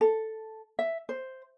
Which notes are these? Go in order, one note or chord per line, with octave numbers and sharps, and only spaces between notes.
A4
E5
C5